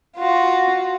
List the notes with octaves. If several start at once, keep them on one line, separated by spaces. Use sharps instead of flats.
F4 F#4